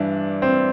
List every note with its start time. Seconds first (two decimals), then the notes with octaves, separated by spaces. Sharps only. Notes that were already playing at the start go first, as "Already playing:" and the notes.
Already playing: G2 E3 D4
0.42 C4